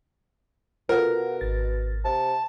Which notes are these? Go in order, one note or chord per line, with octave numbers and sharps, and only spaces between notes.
B2 F4 A4 A#4 F#5
G#1 A6
C3 A5